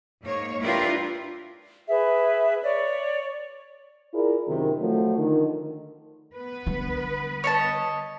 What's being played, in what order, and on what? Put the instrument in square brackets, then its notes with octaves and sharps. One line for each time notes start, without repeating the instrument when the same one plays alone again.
[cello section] G#2 A#3 C#5
D4 E4 F4 G4 A#4 B4
[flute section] G#4 B4 E5
C#5 D5
[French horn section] E4 F4 G#4 A#4 D5
F#2 C3 D#3
F3 F#3 A3
D3 D#3
[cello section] B3 B4
[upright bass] D3 G3
[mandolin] C#5 D#5 A5